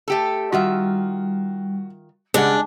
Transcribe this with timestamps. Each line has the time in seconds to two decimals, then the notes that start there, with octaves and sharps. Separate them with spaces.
0.08 A3 G4 A4
0.52 D#3 G3 F4 F#4 E5
2.34 C#3 G3 G#3 D4 F#5 G#5